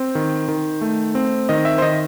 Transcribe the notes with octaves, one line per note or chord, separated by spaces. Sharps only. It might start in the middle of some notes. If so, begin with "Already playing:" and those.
Already playing: C4 C5
D#3
D#3
A3
C4
D#3 D#5
E5
C5
D#3 D#5